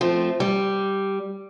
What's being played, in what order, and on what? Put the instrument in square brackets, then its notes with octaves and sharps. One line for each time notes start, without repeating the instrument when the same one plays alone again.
[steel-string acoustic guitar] F3 A3 C4
G3